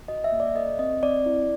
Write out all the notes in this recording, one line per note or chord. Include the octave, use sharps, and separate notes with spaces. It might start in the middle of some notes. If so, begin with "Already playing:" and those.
F#4 D#5
E5
A#3
D5
A4 D#5
C4 D#5
C4 D5
E4